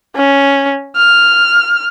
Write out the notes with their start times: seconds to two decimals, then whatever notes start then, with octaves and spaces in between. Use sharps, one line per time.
0.16 C#4
0.96 F6